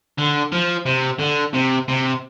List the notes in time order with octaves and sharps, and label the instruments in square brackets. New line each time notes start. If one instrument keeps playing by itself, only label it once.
[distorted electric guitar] D3
F3
C3
D3
C3
C3